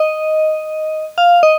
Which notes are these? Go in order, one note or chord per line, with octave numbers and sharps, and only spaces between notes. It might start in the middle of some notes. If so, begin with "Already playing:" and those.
Already playing: D#5
F5
D#5